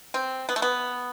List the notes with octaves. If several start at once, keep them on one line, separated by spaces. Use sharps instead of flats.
C4
B3
A3
B3